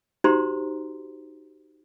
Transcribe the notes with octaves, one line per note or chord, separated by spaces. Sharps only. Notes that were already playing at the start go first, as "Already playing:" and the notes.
D#4 F#4 G4 C5 A#5 C6